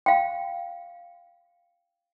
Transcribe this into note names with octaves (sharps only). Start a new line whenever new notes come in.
F5 G5